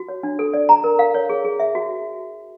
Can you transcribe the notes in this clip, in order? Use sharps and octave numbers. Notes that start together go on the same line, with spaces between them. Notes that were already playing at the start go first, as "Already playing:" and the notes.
Already playing: F#4
C#5
D4
A4
D5
A#5
A#4
F5
C#5
G#4
G#4
E5
F#4